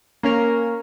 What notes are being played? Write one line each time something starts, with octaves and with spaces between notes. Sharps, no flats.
A#3 C#4 A#4